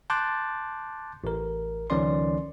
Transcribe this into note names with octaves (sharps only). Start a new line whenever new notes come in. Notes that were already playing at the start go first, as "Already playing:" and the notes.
A5 C6 D6 F#6 G6 A6
A1 A#4
C#2 D#3 F3 C#4 D5 C6